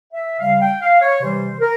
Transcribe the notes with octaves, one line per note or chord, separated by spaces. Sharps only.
E5
C#3 G3 F5
G5
F5
C#5
C3 E3 G3 C5
A#4